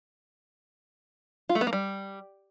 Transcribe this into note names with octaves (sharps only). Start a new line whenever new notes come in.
F4
A3
B3
A#3
G3